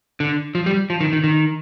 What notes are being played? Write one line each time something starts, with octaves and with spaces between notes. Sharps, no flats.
D3
F3
G3
F3
D#3
D#3
D#3